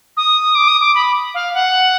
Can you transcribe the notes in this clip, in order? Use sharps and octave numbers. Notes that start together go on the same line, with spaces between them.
D#6
D6
D#6
D6
B5
F5
F#5